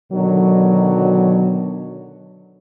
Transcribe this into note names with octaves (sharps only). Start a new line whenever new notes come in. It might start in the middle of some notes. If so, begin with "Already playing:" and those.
B2 D3 D#3 F#3